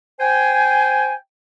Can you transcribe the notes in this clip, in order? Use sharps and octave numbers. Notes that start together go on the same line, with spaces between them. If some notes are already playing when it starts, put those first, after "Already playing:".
C5 G5 G#5